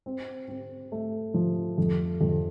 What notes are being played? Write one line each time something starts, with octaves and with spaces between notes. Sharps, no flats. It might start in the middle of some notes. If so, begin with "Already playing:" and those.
C4
C4
A3
F3
F2
F2